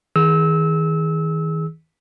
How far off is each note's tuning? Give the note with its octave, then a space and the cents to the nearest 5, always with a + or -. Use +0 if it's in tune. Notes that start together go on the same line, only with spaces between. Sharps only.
D#3 +40 G#4 +0 E6 -25